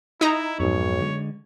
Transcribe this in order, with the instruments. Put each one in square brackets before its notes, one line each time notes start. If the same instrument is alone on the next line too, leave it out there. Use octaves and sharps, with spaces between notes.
[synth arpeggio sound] D#4 A#5 [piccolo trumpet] E4
[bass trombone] B1 [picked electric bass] F2 G#2 [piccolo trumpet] C#5
[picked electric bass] D3 G#3